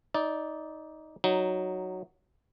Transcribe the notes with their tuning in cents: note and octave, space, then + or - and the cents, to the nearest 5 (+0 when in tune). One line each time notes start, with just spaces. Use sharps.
D#4 +10 D5 -10
F#3 +0 D#4 +0